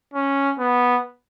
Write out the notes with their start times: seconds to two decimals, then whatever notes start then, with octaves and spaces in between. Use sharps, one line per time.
0.14 C#4
0.59 B3